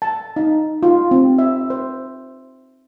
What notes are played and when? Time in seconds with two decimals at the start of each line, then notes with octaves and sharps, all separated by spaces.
0.02 A5
0.36 D#4
0.83 F4
1.11 C4
1.38 E5
1.70 C5